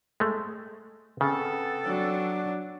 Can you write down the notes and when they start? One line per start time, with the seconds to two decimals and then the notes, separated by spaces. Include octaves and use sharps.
0.20 G#3 A3
1.21 C#3 B3 C4 A4
1.85 F#3 D4